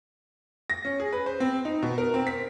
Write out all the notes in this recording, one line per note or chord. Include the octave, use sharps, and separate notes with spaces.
A#6
C#4
G#4
B4
C5
C4
D#4
B2
A#4
C4
B6